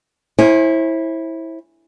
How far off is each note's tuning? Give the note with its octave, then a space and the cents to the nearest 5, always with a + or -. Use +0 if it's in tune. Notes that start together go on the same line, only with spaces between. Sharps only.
E4 -10 C5 +40 G#5 +0